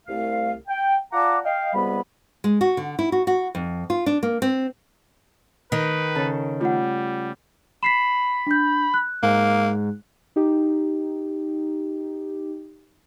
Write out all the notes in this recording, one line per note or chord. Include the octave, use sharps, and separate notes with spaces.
C2 A3 F5
G5
F4 D5 F#5 A5 A#5 D6
D#5 F5 G5
C#2 C3 G3 B3 B5
G#3
F#4
D3
E4
F#4
F#4
F2
F4
D4
A#3
C4
D#3 B4
C#3 A4 A5
G3 A3 F4 F#5
B5 B6 C7 E7
D4 G6
F#6
G#2 A#3
D#4 G4